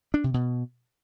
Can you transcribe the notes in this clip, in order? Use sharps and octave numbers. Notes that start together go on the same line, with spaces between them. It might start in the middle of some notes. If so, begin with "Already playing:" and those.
D4
C3
B2